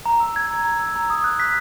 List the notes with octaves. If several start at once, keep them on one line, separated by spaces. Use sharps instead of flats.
A#5
E6
G#6
A#5
A#5
E6
A#5
D#6
F#6
B6